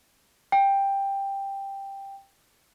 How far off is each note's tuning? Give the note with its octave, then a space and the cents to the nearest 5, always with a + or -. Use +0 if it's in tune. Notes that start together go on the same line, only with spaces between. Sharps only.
G5 +10